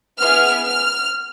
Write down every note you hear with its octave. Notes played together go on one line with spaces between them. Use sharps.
B3 E4 G#4 F6
F6